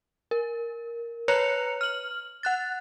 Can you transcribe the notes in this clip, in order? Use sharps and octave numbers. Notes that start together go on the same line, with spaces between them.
A#4
B4 C#5 A#5 F#6 C#7 F7
F6 F#7
F#5 F#6 A6